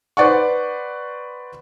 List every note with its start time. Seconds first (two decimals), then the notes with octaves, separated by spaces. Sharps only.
0.17 B4 C5 D5 F#5 C#6